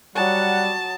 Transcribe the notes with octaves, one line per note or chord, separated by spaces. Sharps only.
F#3 G3 D#5 F#5 A5 C#6